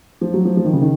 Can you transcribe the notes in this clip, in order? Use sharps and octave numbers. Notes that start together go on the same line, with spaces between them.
F3
F#3
F3
F3
D#3
C#3
D#3